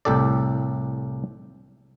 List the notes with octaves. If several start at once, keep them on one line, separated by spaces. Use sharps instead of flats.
C2 A2 G4 A4 D5